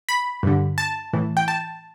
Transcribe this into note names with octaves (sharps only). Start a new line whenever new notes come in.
B5
G2 D3
A5
A2 E3
G5
A5